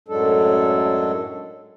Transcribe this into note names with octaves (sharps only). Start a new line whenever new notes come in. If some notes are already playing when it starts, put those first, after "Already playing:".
F#2 A2 F#3 G#3 D4 A4